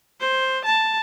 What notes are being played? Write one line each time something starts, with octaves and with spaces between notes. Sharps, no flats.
C5
A5